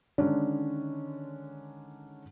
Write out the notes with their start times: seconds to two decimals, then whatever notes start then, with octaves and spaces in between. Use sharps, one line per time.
0.18 D3 D#3 G#3 C#4 D4